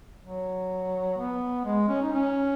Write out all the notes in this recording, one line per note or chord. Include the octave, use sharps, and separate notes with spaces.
F#3
B3
G#3
C#4
D#4
C#4